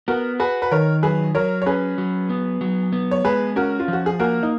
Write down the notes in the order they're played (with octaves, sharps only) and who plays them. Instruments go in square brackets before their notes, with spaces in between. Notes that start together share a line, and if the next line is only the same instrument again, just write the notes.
[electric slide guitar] B3 [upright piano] F#4 A#4
[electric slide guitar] F#4 [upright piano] G#4 B4
[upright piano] B4
[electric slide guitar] D#3 [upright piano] A#4 C#5
[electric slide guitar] F#3 [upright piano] G#4 B4
[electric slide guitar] F#3 [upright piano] A#4 C#5
[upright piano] C#5
[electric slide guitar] C#4 [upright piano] G#4 B4
[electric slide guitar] F#3
B3
F#3
B3
[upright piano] C#5
[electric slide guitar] G#3 [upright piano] G#4 B4
[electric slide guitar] C#4 [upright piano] F#4 A#4
[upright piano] F4
[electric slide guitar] F3 [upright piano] F#4
[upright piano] G#4
[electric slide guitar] A#3 [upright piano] F#4 A#4
[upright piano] D#4